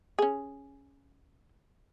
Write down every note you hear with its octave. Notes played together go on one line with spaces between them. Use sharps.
C#4 G#4